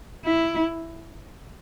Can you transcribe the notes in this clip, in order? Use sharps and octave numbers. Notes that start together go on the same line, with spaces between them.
E4